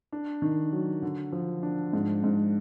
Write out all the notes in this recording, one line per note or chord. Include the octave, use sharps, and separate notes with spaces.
D4
D#3
F#3
D3
F3
D4
G#2
G#2